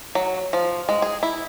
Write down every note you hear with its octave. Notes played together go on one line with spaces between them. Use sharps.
F#3
F3
G#3
G#4
E4